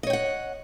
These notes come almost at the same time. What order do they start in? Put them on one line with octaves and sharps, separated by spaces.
D#5 C#5 G5 F#5